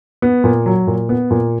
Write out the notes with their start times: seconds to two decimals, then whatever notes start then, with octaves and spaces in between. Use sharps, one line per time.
0.22 B3
0.44 A#2
0.66 F#3
0.87 A#2
1.09 B3
1.31 A#2